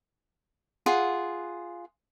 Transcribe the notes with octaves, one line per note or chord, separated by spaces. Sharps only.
F4 G#4 F#5